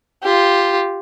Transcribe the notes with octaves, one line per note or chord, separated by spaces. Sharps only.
F4 G4